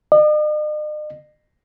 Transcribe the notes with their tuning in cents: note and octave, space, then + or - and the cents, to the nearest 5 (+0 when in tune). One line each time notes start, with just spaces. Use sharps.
D#5 -45